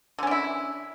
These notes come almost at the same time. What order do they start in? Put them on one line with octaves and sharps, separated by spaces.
D3 C#4 D4 E4